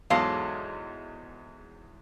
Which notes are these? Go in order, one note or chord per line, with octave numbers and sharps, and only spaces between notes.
E2 G#2 F#3 A4 D#5 F5 C6 D6